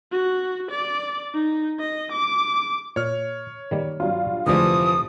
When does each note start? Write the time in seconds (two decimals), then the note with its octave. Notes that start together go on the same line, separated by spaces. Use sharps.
0.12 F#4
0.71 D5
1.34 D#4
1.79 D#5
2.12 D6
2.96 A#2 C#5 F6
3.71 D#3 G3 A#3
4.00 G2 F#3 F4
4.47 F1 D2 E3 F3 G3 G#3 D#6